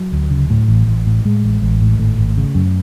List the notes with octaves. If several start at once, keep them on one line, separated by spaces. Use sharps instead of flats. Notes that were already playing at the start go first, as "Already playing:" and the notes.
Already playing: F#3
D2
C#3
A2
A1
A1
A2
A2 G#3
A1
A1
A2
G#1 A3
G#1
C#3
F#2